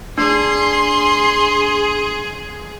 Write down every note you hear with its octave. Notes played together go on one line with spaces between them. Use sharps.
D4 G#4 C6